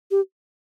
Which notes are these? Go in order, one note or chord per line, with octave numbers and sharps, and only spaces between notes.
G4